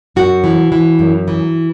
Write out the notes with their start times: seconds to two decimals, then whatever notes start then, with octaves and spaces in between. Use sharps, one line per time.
0.16 F#2 F#4
0.44 E3
0.72 E3
0.99 F#2
1.28 E3